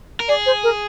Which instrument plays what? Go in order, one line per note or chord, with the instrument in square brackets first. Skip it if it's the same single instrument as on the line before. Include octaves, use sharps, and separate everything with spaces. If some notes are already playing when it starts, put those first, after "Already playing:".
[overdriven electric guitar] A#4
[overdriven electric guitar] G#4 [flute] D5
[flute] C5
A#4